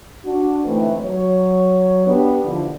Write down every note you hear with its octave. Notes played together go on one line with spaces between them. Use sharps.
D4 F#4
D2 G#2 E3 A3 C4 B4
F#3 C#5
B3 D4 G4
D#2 B2 D3 E3 F3